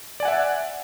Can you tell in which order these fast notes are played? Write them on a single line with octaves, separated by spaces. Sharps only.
D5 G#5 F#5 E5